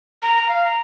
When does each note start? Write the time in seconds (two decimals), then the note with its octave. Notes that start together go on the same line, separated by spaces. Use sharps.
0.22 A#5
0.36 A#5
0.49 F5
0.65 A#5